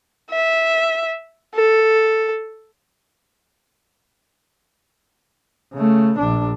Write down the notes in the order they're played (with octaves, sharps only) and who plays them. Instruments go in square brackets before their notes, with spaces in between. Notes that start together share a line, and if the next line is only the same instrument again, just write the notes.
[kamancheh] E5
A4
[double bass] C#3 A3
A#1 D4